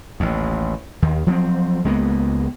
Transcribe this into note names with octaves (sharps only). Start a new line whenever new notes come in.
A1 D#2
D#2 D#3
F3 F#3 B3 C4
C#2 G#3 A#3 B3